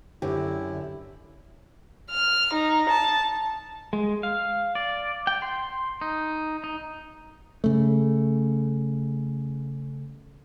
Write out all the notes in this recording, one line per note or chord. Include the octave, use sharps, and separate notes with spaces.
F#2 D3 E4 G4
F6
D#4
A5
G#3
F5
D5
G5
C6
D#4
D#4
C#3 A3